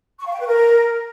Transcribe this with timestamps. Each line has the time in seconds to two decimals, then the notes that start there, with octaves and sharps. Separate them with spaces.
0.19 C#6
0.26 F5
0.33 G5
0.40 B4
0.47 A#4